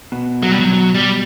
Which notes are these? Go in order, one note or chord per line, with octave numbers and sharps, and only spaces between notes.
B2
F#3
G3
F#3
F#3
G3